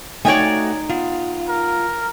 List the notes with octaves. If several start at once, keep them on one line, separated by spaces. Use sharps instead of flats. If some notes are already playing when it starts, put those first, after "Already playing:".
A3 D#4 F#4 C#5 D5 G5 G#5
B3 F4
A#4